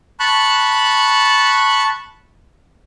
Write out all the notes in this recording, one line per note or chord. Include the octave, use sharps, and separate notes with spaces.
A5 B5 C#6 F#6